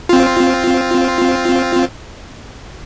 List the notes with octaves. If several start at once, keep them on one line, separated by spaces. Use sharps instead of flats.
C4 F4